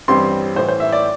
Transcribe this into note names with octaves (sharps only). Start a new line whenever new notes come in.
A1 G2 G3 C4 C6
A1 A2 E3 C5
C5
E5
D5